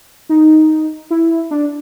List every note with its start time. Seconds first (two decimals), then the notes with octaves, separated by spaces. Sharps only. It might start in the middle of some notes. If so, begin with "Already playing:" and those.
0.29 D#4
1.11 E4
1.51 D4